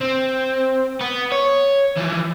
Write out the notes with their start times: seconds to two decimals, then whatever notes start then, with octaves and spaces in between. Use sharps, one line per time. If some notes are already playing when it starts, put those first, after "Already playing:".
0.01 C4
1.01 B3 B4
1.32 C#5
1.97 E3 F3